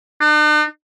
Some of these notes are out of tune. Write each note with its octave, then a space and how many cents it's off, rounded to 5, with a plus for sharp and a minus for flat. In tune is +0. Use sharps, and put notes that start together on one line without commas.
D4 +45